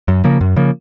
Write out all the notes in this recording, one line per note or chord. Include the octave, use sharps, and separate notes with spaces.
F#2
C#3 F3 A#3
F#2
C#3 F3 A#3